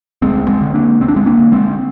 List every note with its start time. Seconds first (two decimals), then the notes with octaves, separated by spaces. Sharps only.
0.22 D2 G#3 C4
0.49 G#3 C4
0.61 D3
0.74 A#3 D4
1.00 D2 C4
1.08 D4
1.16 G#3 C4
1.26 A#3 D4
1.39 D3
1.52 G#3 C4